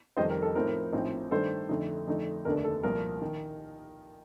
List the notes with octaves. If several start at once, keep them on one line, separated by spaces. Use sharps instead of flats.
F1 F2 D#3 G3 C5 D#5
A#4
A4
A2 F3 C4 D#4 A#4
A#1 A2 F3 C4 D#4
G2 D#3 A3 D4 A4 C5
F2 D3 A3 D#4
F2 D3 A3 D#4
F1 D#2 D3 A3 D4 A#4
A4
C2 A#2 F3 A#4
D#3